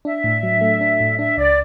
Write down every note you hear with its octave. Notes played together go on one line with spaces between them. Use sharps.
D4 E5
A2
F#3
A3
D4
A2
D4 E5
C#2 D5